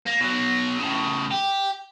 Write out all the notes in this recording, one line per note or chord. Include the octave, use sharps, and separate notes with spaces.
A#3
B2 F#3
A2 C#3
G4